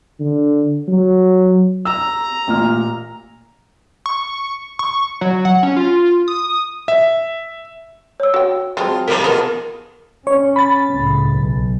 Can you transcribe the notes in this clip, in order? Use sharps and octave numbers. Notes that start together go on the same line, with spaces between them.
D3
F#3
A#5 E6
A1 A#2 F6
C#6
C#6
F#3
F#5
C#4
F4
D#6
E5
C#5 E6
F#4 G5
F#3 G#3 C4 F4 G5 A5
G#2 C3 F3 A#4 A#5 B6 D7
B2 B3 F4 G#4 A#4
C#4 C#5
B5 A6
C#2 A2
B1